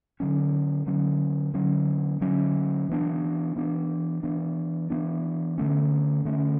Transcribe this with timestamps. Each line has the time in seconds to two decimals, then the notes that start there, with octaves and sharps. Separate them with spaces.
0.20 D3 F#3 C#4
0.87 D3 F#3 C#4
1.54 D3 F#3 C#4
2.21 D3 F#3 C#4
2.89 E3 B3 D4
3.56 E3 B3 D4
4.23 E3 B3 D4
4.90 E3 B3 D4
5.58 D3 A3 C#4
6.25 D3 A3 C#4